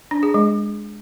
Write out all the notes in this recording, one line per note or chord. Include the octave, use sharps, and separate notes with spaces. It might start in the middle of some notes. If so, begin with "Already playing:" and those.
D4
G#4
G#3